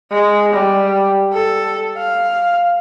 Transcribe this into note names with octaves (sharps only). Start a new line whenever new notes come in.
G#3
G3
A4
F5